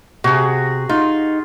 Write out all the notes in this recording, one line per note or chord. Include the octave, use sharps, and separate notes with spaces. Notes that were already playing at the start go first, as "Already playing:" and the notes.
C3 F#4 G#4
D#4 F4